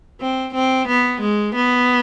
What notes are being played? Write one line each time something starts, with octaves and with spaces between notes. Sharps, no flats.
C4
C4
B3
G#3
B3